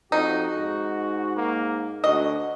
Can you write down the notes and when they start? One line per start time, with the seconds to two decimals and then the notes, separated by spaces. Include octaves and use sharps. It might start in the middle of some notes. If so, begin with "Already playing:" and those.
0.12 F2 D#4 F#4
0.55 G#2
1.36 A#3
2.04 D2 F#4 D#5